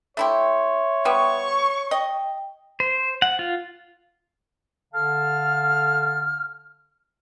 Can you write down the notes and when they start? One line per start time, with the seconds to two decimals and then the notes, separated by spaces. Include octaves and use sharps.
0.17 A3 E4 G4 C#5 E5 C6
1.05 G3 B3 C#6
1.91 D#5 G5
2.80 C5
3.22 F#5
3.39 F4
4.93 D3 A4 F5 A5 F6